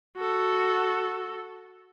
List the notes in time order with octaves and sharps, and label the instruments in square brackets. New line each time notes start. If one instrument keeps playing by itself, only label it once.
[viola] F#4 A4